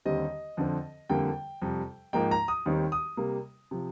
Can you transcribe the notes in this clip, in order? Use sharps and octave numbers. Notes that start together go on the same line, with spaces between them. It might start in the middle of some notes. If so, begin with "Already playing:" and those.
D#2 D3 G3 C4 D#5
F2 D3 F3 C4
F2 D3 G3 A#3 G5
F2 C3 G3
G#2 F3 A#3 D#4 G5
A#5
D#6
D#2 D#3 G3 C4 D#4
D#6
C3 G3 A#3
C3 F3